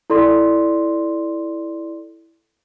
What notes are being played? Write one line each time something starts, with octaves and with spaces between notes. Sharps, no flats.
E4 A4 D5 C6